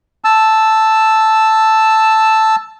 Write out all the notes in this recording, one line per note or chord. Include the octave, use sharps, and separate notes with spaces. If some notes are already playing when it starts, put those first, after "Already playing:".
A5 E6